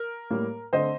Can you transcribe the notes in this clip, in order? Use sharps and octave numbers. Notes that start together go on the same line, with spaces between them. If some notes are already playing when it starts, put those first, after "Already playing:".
Already playing: A#4
A2 G3 A#3
D3 A3 C4 C5 D#5